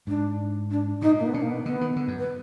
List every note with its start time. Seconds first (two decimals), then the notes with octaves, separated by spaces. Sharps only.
0.07 G#2 D4
0.71 D4
1.02 A#2 D#4
1.20 A#3
1.27 B3
1.34 B2 D4
1.42 A#3
1.50 B3
1.66 D3 B3
1.81 D#3
1.96 D3
2.08 F#2
2.19 B4